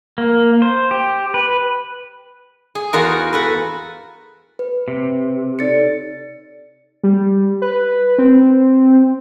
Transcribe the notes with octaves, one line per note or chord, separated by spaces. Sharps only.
A#3
C5
G4
B4
G#4
E2 F4 F#4 G#4 A#4
F#4 A4 B4
B4
C3
D#4 A4 C#5 D5 A6 C#7
G3
B4
C4